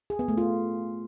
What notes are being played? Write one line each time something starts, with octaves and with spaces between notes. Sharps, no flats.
G#4
B3
A3
F4